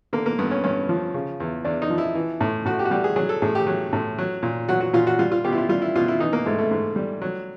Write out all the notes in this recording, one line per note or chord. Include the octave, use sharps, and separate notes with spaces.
D3 A#3
A#3
G2 B3
C#4
G2 C#4
F3
C#3
E2
E2 D4
D#4
F3
E4
E3
A2
A2 F#4
G4
F#4
G3 G4
G#4
F#3 G#4
A4
A2 G#4
G4
F#3
A2
F#3
A#2
F#3 F#4
F#4
A#2 F4
F#4
G3 F4
F4
B2 G4
E4
F4
G3 F4
E4
B2 F4
E4
E3 D#4
A#3
G#2 A3
A3
G#2
G3
F#3